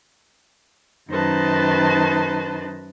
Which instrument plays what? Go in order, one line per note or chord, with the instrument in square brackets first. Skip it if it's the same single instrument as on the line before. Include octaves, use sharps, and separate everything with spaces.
[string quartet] F#2 D#3 D#4 B4 C5 A5